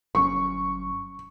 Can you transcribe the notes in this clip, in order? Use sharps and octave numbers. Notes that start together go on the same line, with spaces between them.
G1 F#3 C#4 C#6